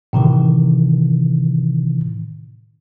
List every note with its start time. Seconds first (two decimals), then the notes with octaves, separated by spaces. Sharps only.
0.13 A2 C3 D#3 E3